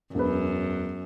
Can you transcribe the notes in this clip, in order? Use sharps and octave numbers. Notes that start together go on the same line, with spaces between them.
E1 F#2 B4